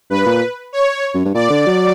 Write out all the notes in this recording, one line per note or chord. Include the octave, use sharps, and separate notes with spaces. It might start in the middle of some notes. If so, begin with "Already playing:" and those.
G2 B4
A#2
C#5
F#2
G2
A#2 D5
D3
F#3